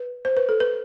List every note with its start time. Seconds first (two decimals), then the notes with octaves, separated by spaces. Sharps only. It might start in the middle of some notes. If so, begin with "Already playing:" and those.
Already playing: B4
0.25 C5
0.37 B4
0.49 A4
0.60 B4